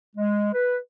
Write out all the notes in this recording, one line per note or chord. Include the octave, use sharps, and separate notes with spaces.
G#3
B4